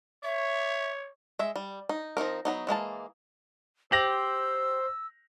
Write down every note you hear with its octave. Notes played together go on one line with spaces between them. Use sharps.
C#5 E5
G#3 E5
G3
D#4
F3 C4 D#4 A#4
F#3 B3 D#4
E3 G#3 A#3 A5
G4 C5 E6 A#6 F7 F#7